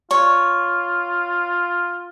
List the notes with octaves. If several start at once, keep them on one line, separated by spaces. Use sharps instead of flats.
F4 C#5